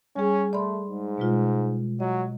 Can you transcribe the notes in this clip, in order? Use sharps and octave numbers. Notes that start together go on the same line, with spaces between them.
G3 C#4 G#4
A3 D5 B5 C6
G#2
B2 G#3 F4
F#3 D#5